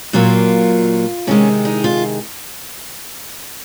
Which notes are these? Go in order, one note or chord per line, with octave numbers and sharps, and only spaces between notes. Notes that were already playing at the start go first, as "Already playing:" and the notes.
A#2 F#3 A#3 F4
C3 D#3 G#3 C#4
D#4
F4